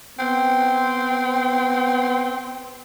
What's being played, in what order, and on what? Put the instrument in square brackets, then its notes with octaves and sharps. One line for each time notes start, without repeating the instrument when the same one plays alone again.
[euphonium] B3 [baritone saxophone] C4